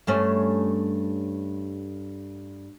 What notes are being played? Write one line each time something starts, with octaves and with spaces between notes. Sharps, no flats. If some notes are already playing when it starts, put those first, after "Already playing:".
G2 A3 C#4